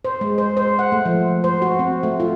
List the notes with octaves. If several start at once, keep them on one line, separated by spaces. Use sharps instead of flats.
C5
G#3
C5
C5
F#5
A3
F3
C5
F#4
C4
A3
F4